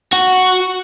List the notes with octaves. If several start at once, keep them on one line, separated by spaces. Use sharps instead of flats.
F#4